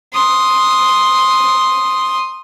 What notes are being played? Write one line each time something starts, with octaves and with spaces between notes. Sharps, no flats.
C6 D#6